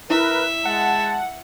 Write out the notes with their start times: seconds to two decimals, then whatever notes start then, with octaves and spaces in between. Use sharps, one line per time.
0.10 E4 A#4 B4 E5
0.65 G#3 F#5 A5